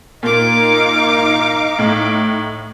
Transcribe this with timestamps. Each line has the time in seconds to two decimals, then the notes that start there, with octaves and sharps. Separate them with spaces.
0.23 A#2 D#4 F5 D6
1.79 A2